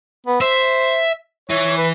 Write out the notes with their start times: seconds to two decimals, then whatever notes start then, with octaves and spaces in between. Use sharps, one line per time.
0.27 B3
0.41 C5 E5
1.50 E3 C#5
1.77 B4